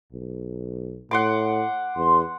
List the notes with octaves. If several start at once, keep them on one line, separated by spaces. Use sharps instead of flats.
B1
A2 F#5 C6 D6
E2 C6